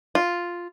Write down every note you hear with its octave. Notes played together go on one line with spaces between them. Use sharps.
F4